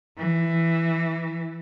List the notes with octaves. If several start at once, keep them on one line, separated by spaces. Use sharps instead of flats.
E3